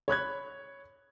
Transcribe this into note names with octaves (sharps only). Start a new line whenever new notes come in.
C#5 B5 F#6 G#6